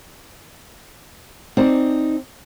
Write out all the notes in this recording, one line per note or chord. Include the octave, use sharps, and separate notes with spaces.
C4 D#4 C5 D5 A5